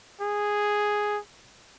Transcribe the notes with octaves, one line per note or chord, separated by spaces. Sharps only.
G#4